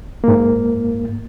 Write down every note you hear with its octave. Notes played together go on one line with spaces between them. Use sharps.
G#2 A#3